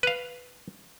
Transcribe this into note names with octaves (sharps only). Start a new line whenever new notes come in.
B4 F5